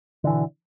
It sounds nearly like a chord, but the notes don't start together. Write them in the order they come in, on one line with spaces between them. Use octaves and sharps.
D3 E3 B2